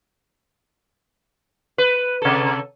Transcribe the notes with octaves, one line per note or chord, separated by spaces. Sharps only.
B4
C3 A4